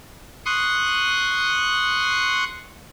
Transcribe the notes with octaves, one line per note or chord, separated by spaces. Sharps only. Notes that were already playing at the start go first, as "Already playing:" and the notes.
C6 C#6 D#6 F#6